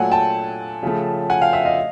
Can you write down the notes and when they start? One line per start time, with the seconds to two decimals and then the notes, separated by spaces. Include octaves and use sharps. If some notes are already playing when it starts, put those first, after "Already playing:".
Already playing: A#2 F#3 A3 F#5 G#5
0.11 G5 A5
0.83 C#3 F3 A3
1.30 F#5 G#5
1.41 F5 G5
1.53 E5 F#5
1.65 D#5 F5